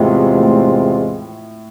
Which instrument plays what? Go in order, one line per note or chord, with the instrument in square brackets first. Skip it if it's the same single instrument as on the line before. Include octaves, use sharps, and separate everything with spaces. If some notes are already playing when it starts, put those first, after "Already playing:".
Already playing: [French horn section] E2 C3 G#3 C4 F4 [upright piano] A2
[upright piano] A2